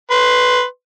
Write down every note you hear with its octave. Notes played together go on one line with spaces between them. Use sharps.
B4 C6